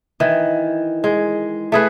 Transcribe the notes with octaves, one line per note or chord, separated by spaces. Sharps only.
D#3 E3
G#3
A3 G#4 B4